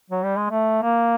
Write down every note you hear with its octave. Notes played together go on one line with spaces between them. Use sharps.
F#3
G3
G#3
A3
A#3